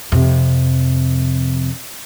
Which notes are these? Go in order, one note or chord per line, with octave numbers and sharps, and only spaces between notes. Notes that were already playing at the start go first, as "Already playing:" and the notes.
F2 C3